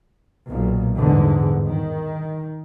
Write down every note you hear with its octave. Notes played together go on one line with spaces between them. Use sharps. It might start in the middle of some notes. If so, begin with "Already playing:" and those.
B1 A#2
G1 E2 G#2 D3
D#3